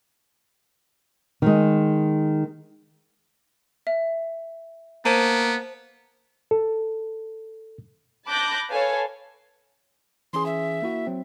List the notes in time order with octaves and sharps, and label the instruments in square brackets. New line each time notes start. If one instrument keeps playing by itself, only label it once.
[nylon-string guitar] D#3 G#3
[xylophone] E5
[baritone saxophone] A#3 [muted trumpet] B3 [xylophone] C5 A5 D#7
[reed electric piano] A4
[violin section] A5 B5 D6 F#6 G6 A#6
A4 B4 C#5 F5 G#5 A5
[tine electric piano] E3 C#4 G#4 [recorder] C6
[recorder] E5
[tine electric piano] A#3 E4 F#4
F#3 C4